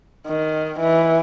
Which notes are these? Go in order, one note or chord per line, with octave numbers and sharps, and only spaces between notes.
D#3
E3